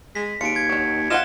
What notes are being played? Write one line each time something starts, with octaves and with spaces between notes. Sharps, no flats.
G#3 B6
D#2 F4 C#7 D7
G#6
D#3 F#3
F4 D#5 F5 F#5 E7 G7